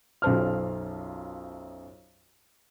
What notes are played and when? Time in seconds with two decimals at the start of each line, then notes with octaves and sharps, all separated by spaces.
0.22 B1 F#2 F4 C5 A5 F6